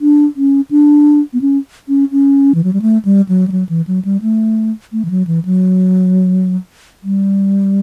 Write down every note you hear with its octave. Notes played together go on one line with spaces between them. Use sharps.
D4
C#4
D4
B3
C#4
C#4
C#4
E3
F#3
G3
A3
G3
F#3
G3
F#3
E3
F#3
G3
A3
A3
E3
F#3
E3
F#3
G3